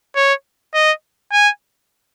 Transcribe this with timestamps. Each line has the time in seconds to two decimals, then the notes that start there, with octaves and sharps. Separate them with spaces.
0.16 C#5
0.74 D#5
1.32 G#5